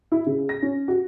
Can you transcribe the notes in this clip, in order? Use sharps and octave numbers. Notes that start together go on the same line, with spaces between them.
E4
C#3
A#6
C#4
F#4